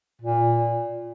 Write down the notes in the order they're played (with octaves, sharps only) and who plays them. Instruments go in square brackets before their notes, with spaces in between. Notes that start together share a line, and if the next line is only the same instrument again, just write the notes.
[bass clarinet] A#2